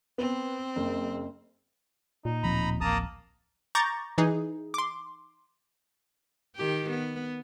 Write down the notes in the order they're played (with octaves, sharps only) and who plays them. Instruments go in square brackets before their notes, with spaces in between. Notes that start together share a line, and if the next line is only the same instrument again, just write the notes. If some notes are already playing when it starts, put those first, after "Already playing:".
[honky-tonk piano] B3 [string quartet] C4
[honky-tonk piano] F#1
[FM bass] A#2 [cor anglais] D#4
[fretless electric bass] D1 F3 C4 [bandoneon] A#5 B5
[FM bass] A1 [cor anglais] A#3 [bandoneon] A5 A#5 D#6
[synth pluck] A#5 C#6 D6 G6 A6 A#6
E3 D#4 G#4
C6 D6
[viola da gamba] D#3 G4
B3